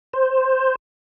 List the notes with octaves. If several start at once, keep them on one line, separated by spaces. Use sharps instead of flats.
C5